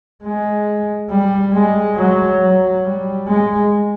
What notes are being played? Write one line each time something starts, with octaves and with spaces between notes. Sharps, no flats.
G#3
G3
G#3
F#3
F#3
G3
G#3